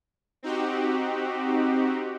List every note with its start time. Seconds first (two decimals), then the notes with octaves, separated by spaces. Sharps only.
0.43 C4 D#4 F#4 G4